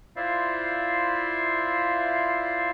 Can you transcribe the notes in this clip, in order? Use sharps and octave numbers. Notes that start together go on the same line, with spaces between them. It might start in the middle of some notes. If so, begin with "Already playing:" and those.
E4 F4 C5 D5 E5 F5